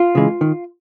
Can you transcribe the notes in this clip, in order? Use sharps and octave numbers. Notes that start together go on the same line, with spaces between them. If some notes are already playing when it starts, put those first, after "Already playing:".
Already playing: F4
C#3 E3 G#3
D#3